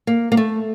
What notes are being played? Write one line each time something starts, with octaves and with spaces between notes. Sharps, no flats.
A#3
A#3
A3